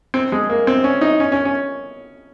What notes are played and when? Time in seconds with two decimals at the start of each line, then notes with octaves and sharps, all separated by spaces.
0.14 C4
0.32 G#3
0.50 A#3
0.67 C4
0.84 C#4
1.01 D#4
1.20 C#4
1.32 C#4
1.45 C#4